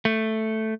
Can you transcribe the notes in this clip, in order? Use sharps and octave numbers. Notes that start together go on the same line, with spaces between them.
A3